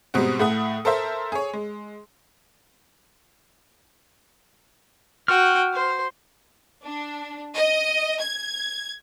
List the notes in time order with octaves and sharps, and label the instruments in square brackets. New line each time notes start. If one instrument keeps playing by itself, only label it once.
[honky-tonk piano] G#2 B2 G3 G#3 C4 F#4
A2 A3 F#5 D#6
A4 A#4 C5 E5
G#4 C#5
G#3
[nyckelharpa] F#4 G5 [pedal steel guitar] F6
[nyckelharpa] C5
[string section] D4
D#5
G#6